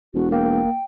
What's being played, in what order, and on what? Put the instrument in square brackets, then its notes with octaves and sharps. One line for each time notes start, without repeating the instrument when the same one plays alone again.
[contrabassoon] E1 [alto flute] F#4
[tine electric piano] A#3 [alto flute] G5